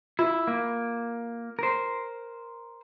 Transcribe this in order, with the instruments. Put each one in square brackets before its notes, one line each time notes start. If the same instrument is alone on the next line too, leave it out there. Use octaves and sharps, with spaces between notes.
[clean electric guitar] E4 [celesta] F4
[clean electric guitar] A#3
A#4 C5